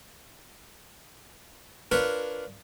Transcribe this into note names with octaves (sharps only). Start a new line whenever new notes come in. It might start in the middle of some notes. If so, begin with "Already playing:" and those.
D4 F4 A#4 B4 C#5